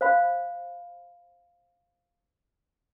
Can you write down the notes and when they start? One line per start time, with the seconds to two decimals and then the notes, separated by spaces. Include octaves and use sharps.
0.01 C5 F5 B5